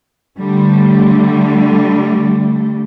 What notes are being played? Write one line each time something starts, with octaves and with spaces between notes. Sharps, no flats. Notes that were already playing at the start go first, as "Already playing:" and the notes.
D3 G3 A3